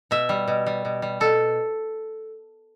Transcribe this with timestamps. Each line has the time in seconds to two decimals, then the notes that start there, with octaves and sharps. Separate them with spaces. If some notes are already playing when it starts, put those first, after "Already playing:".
0.11 B2 E5
0.29 G3
0.48 B2
0.66 G3
0.85 B2
1.02 G3
1.20 B2 A4